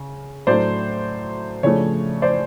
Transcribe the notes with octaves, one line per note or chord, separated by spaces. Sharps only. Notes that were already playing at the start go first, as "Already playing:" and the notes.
Already playing: C#3
A2 F#3 A3 D4 C5 D5
C#3 F3 A3 D4 C#5
C5 D5